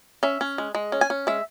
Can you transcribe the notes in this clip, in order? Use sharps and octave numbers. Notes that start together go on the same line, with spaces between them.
C#4 E5
C#4
G#3
G#3
C#4
G#5
C#4
G#3 E5